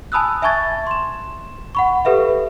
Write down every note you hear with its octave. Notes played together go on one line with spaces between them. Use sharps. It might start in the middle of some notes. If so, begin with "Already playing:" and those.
G#5 A5 B5 D#6 E6 F#6
E5 G#5 A5 C#6 G#6 A6
C6 E7
F#5 B5 C#6
G4 A4 B4 E5 F5